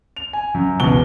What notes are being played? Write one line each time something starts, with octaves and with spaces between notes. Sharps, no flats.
F7
G#5
F#2
E1 C#2 B2 G7